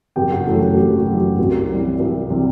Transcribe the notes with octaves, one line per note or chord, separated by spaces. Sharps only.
F#1 G4 G5
F#4 F#5
F#2 E3 A3 A4
A3 A4
F#1 G4
F#4
F#2 E3
G4
C2
C3 E3 G3
C2
C3 E3 G3